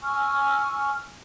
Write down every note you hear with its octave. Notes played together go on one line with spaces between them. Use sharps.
G#5 C#6 E6 F6